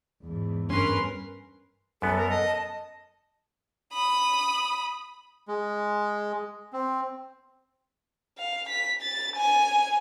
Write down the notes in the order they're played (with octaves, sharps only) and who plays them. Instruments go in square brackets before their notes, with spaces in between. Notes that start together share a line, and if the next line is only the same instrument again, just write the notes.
[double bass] E2 G#2
[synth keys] G2 [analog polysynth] C#4 B4 [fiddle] A#4 C6
[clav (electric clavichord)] F#2 B3 [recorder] G3 [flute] A4
[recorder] A#4
D#5
[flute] A5
[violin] B5 D#6
[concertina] G#3
C4
[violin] F5
B6
A6
G#5